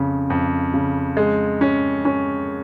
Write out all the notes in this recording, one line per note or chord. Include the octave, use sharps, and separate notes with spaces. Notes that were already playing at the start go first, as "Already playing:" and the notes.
Already playing: F2 C#3
F2
C#3
G#3
C#4
C#4